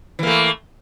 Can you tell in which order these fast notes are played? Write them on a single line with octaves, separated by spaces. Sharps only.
E3 A#3 A3